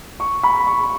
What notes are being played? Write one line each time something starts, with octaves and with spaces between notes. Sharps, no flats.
C#6
B5
C#6